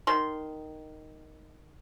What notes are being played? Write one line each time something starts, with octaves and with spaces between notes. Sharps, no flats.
D#3 C6